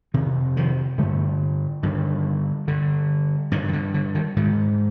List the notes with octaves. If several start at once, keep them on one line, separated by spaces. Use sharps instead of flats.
F2 C3 D#3
D#3 F3
G2 D3 G3 A3
G2 D3 D#3
G2 D3
G2 D3 D#3
D#3
D3
D3
D#3
G#2 D#3